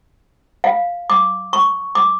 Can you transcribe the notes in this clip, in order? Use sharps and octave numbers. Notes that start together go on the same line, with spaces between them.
F5
D6
C#6
D6